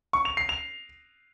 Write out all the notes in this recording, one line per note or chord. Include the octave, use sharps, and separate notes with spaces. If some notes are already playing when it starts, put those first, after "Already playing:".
C#6
F7
C7
F7